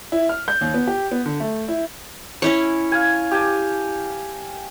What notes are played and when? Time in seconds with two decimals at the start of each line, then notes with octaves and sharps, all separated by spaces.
0.12 E4
0.29 F6
0.48 G6
0.61 D#2
0.74 B3
0.87 G4
1.11 B3
1.26 D3
1.40 A3
1.68 E4
2.42 C#4 E4 C#5
2.92 F5 G#5
3.31 G4 G#5 A5